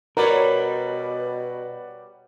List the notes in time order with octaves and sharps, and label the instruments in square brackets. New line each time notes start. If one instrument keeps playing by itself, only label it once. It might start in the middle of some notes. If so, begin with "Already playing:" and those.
[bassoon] B2 [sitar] G3 C#5 [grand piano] F#4 B4 D5 [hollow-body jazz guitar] A#4